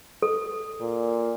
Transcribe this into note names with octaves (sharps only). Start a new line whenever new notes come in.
A4
A#2